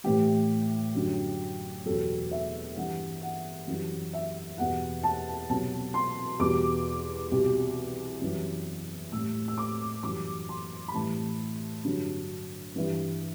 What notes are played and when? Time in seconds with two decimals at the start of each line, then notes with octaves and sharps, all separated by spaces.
0.04 A2 E3 G3 G4
0.95 F#2 D3 F#3
1.86 E2 B2 F#3 A4
2.31 E5
2.77 G2 E3 G3 F#5
3.22 F#5
3.67 F#2 E3 G3
4.13 E5
4.58 E2 B2 G3 F#5
5.03 A5
5.49 C2 B2 F#3 A5
5.94 C6
6.39 E2 B2 G3 D6
7.31 C2 B2 G3
8.22 F#2 E3 G3
9.12 A2 G3 E6
9.48 E6
9.58 D6
10.03 F#2 E3 G3 D6
10.49 C6
10.88 B5
10.94 A2 E3 G3 A5
11.84 G2 D3 F#3
12.76 G2 E3 G3